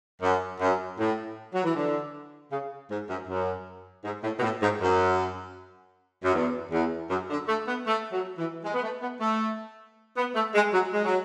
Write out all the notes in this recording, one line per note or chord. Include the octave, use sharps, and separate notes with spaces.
F#2
F#2
A2
F#3
E3
D3
C#3
G#2
F#2
F#2
G#2
A2
B2
A2
G#2
F#2
F#2
E2
E2
F#2
D3
A3
B3
A3
F#3
E3
G#3
B3
A3
B3
A3
B3
A3
G#3
F#3
G#3
F#3